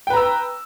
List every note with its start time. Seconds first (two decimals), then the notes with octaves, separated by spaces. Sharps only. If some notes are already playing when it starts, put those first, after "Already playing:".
0.07 G5
0.10 B4
0.13 A#5
0.17 E6